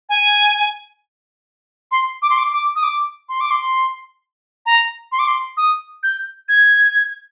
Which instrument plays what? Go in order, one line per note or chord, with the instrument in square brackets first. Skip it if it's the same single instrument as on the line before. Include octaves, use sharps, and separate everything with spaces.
[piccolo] G#5
C6
D6
C6
D6
D6
D#6
D6
C6
D6
C6
A#5
C6
D6
C6
D#6
G6
G#6